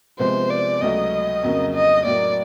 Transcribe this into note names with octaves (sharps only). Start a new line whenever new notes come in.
C3 F3 G#3 B3 C5
D5
C#2 C#3 F#3 A3 D#5
F2 C#3 F#3 A#3
D#5
A2 F#3 A#3 D5